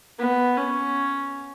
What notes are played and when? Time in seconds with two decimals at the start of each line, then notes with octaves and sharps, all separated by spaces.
0.19 B3
0.57 C#4